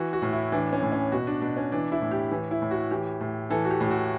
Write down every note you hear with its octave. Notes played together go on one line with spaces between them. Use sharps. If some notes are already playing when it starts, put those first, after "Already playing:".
Already playing: E3 F#4
F#4
A2
E4
E3 D4
C#4
A2
C#4
B2 F#4
D4
B2 D4
C#4
E3 D4
E4
A2
G4
E3
E4
A2
F#4
E3 G4
A2
E3 A4
F#4
G4
A2 G4
F#4